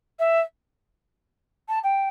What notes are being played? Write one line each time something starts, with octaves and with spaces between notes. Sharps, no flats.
E5
A5
G5